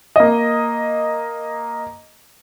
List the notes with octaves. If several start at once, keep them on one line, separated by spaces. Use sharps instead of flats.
A#3 D#5